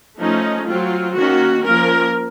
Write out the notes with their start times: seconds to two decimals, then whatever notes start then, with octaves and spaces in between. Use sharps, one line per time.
0.18 F3 A3 C#4 D#4
0.67 F#3 C4 F4
1.15 D#3 A#3 C#4 F#4
1.64 F3 A#3 C#4 A#4